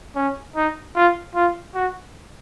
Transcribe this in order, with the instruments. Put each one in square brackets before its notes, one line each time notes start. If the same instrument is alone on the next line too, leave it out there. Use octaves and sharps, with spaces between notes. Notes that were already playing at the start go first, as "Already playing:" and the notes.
[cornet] C#4
D#4
F4
F4
F#4